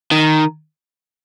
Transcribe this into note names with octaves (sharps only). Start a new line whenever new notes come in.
D#3